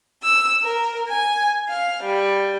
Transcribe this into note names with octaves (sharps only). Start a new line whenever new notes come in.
E6
A#4
G#5
F5
G3